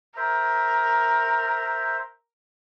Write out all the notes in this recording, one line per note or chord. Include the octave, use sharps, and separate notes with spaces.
A#4 C5 E5